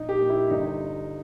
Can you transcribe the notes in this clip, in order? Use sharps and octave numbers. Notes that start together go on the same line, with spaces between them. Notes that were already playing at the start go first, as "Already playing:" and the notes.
Already playing: A#1 D#4
G4
A#2
E4
G1 D#4